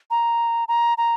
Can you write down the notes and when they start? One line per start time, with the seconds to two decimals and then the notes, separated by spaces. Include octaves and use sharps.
0.11 A#5
0.68 A#5
0.98 A#5